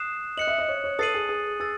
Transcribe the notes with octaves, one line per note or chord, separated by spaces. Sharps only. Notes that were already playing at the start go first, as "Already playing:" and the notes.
Already playing: D#6 F#6 C7 E7
D#5 F#6 C#7 F#7
E5
D#5
C#5
C#5
A4 D#6 A6 C7 D#7 F#7
G#4
G#4
G#4 E6 A6